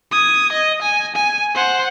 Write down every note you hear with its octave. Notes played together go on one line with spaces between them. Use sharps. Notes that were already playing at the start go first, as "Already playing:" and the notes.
D#6 G#6
D#5
G#5
G#5
C5 F#5